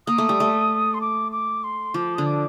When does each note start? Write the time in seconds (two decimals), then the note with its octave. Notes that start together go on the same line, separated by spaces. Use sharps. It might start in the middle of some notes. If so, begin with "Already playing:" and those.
0.07 A#3 D#6
0.18 A3
0.29 G3
0.40 A3
0.94 C6
1.01 D6
1.32 D6
1.64 C6
1.94 F3 D6
2.15 D3 D#6
2.26 D6